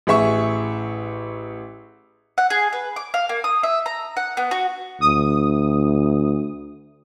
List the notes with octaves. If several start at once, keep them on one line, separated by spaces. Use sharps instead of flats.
A1 G#4 E5 C#6
F#5
G#4
B4
D6
F5
A#3
D#6
E5
A#5
F#5
B3
F#4
D2 D#6